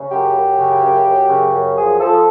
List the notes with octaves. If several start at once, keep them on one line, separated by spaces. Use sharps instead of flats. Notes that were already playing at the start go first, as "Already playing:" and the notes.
Already playing: C#3
F#2 G4
F#2
C#3
F#2
F#2
C#3
F#2
F3 G#4
F3 A4